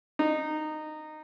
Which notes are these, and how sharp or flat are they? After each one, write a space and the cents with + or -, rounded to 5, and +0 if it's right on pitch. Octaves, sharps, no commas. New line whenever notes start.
D#4 -15